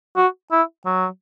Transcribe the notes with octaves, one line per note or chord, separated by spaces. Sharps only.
F#4
E4
F#3